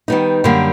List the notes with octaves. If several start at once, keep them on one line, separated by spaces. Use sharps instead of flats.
D#3 G3 B3 D#4
F#2 D3 G3 A#3